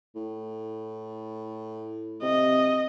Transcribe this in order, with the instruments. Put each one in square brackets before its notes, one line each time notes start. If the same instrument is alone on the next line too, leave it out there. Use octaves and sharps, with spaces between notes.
[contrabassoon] A2
[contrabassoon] C3 [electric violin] D#5